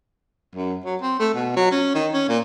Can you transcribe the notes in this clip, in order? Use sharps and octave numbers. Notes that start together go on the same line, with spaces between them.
F#2
F#3
C4
A3
B2
F#3
C#4
D#3
C#4
A#2